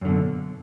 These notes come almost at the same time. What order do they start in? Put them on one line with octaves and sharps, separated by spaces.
F#2 D3 B2